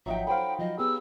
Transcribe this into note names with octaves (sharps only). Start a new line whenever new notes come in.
G#1 F3 F#3 D#4 E5 G5
A4 C5 F5 G5 B5
F3 F#3 D#5
B3 G4 G#4 E6